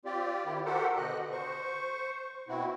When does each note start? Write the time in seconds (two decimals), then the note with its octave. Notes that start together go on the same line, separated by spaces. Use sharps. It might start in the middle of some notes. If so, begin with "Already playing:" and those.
0.05 C4 F4 G4 D5
0.45 D#3 E4 G4
0.66 F#4 G4 A4 A#4 C5 F#5
0.97 B2 D3 D#5 F#6
1.32 C5 C#6
2.48 B2 C4 E4 F#4